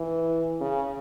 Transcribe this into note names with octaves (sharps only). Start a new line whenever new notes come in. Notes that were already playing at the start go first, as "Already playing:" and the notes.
Already playing: E3
C#3